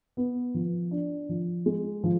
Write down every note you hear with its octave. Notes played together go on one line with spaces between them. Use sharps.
B3
F3
D4
F3
G#3
F3